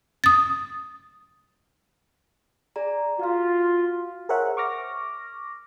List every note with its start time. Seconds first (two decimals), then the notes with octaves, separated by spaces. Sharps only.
0.24 D#6 A6
2.76 G#4 D5 A#5
3.19 F4 F#4 F5
4.29 G#4 A#4 C5 C#5 E5 F#5
4.57 C#6 D6 F6 A#6